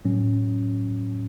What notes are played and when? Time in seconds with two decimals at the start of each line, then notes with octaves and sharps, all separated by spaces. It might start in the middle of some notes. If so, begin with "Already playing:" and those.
0.05 A2 F#3 C#4